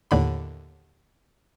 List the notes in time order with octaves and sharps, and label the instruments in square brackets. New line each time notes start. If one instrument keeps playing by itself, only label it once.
[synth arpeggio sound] D#2 A2 D3 B5